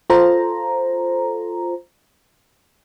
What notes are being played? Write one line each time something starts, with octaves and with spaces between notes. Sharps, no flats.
F4 A4 C5 A#5